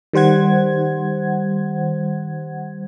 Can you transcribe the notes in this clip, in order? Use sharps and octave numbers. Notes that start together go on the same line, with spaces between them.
D#3 G3 C5 F#5 G#6